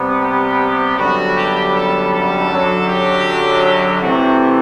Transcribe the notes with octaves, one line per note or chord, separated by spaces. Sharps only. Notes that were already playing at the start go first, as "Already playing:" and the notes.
Already playing: C3 G3 B3
G4
F#2 D3 G3 B3 F#4
G4
A4
A4
F#2 D3 F#3
G4
C3 E3 A3 C4 F#4